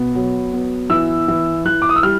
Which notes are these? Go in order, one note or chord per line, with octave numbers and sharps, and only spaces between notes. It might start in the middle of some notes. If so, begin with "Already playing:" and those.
Already playing: B2 B3
F#3
B3
E3 E6
E3
E3 F#6
D6
D#6
E6
G3 F6